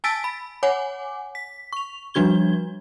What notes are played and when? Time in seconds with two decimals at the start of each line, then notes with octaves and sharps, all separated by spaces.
0.04 G#5 A5 E6 A6 B6 D7
0.24 B5
0.63 C#5 F#5 G#5 D6
1.35 B6
1.73 C#6 F7
2.14 F3 G3 D4 F#4 G#6 G7